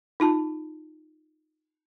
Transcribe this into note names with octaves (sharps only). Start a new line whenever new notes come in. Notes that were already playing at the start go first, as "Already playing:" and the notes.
D#4 F4 A5